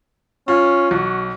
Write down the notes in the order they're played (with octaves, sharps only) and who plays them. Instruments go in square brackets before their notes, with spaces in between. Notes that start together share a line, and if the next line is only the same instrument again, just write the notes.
[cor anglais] C#4 [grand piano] F4
[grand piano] B1 [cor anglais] F#4